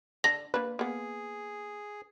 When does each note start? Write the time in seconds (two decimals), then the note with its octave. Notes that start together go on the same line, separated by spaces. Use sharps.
0.24 D3 A5 A#6
0.54 A#3 D4 B4
0.79 A#3 B3 G#4